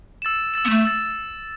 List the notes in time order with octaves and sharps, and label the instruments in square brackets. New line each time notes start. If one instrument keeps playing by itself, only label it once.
[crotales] E6 A6 E7
E6 A6 E7
[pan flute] B3
A3
[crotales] E6 A6 E7